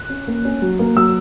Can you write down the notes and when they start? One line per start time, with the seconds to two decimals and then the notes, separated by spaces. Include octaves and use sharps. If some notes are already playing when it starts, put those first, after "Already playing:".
Already playing: F#6
0.10 C#4
0.27 A#3
0.45 C#4
0.62 F#3
0.79 A#3
0.96 F#3 E6